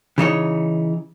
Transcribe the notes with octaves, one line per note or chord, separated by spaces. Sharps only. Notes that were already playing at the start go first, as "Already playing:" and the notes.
C#3 E3 D#4 C#5